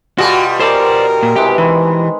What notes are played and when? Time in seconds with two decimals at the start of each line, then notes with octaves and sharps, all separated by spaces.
0.18 B2 G3 F4 F#4 G#4 A4
0.60 G#4 A#4 C5 D5 F5
1.23 A#2
1.36 C3 E3 G#3 G4
1.58 D#3 E3 B5